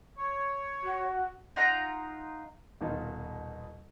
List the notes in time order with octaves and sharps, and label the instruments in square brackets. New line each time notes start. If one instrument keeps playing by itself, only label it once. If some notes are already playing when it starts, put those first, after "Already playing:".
[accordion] C#5
[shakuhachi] F#4
[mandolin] D#4 F4 F#5 A#5
[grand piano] D#1 B2 D#3 D#4 F4